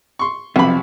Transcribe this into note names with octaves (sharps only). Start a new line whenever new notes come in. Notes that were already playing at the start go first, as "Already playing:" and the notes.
C6 C#6
B1 F2 C3 B5